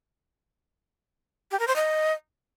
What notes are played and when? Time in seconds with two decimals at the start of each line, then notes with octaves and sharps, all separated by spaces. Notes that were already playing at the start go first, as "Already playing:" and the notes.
1.51 G4
1.59 A#4
1.68 C5
1.76 D#5